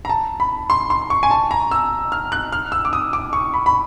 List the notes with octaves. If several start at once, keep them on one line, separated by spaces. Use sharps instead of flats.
A#5
A5
B5
C6
C6
C#6
G#5
A5
A#5
E6
F6
F#6
F6
E6
D6
D#6
D6
C#6
B5
B5